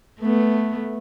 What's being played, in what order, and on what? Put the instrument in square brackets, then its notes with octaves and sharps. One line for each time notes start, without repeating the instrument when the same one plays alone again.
[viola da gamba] A3 B3